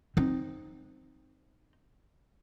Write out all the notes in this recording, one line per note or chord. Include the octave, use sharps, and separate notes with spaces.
C4 D#4